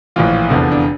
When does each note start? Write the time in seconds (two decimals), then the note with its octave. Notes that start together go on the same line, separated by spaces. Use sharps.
0.16 A#1 A2 E3 F4
0.49 F1 E2 D3 F3
0.72 D4